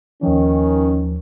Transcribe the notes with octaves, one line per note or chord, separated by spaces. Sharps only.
D#2 D#3 F3 C#4